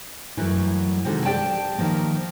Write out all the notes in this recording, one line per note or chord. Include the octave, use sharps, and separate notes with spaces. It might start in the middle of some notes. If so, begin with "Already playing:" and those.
F#2 E3 F#3 G3 A3 E4
C3 D#3 G3 G#3 F#4 A4
G4 D5 G5 A5
D#3 F3 A#3